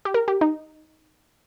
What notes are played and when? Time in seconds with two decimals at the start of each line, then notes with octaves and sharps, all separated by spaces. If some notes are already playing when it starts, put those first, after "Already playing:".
0.05 G4
0.14 A#4
0.28 G4
0.41 D#4